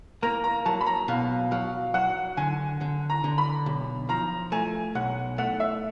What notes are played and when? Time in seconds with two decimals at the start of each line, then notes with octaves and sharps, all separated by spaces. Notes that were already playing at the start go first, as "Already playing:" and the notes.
0.22 A#3 A#5
0.44 A#5
0.65 F#3 A5
0.81 B5
0.87 A#5
1.08 B2 F5
1.51 F#3 F5
1.94 F#3 F#5
2.37 D3 G#5
2.81 D3
3.10 A#5
3.24 D3
3.38 B5
3.66 B1
4.09 F3 A#5
4.52 A3 G#5
4.95 B1 F#5
5.38 A3 F#5
5.60 E5